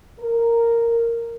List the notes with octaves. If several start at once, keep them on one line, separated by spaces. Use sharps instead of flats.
A#4